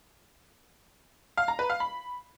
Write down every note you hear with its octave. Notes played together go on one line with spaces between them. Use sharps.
F5
A#5
B4
F5
B5